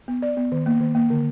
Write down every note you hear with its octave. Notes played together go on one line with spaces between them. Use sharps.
B3
D5
B3
D#3
A#3
D#3
A#3
D3